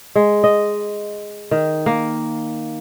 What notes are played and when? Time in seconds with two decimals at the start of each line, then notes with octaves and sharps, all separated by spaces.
0.16 G#3
0.44 D#5
1.51 D#3
1.86 A#3